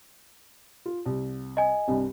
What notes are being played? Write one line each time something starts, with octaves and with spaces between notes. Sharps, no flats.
F4
C2
D#5 G#5
C2 G2 C3